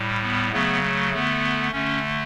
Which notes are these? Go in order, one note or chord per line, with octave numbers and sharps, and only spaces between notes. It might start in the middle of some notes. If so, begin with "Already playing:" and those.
Already playing: A2 G3
B3
C#3 F#3 A3 B3
A3
D3 A3 B3
D3 A3 C#4